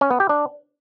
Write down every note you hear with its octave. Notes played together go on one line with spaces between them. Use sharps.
C#4
B3
G4
D4